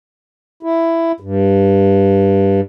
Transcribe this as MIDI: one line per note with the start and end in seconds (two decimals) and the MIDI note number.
0.63 1.12 64
1.20 2.61 43